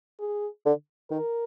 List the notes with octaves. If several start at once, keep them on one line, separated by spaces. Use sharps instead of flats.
G#4
D3
D#3 A#4